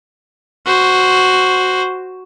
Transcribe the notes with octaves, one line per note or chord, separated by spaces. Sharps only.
F#4 C5